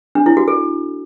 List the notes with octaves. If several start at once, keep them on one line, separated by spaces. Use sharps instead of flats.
D4
E4
F#4
A4